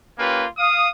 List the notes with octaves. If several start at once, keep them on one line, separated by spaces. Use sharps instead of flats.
A#3 C#4 F4 G4 B4
F5 D#6